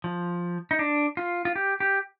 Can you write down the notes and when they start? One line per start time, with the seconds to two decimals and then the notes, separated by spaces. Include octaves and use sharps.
0.04 F3
0.71 D#4
0.79 D4
1.17 F4
1.45 F4
1.56 G4
1.80 G4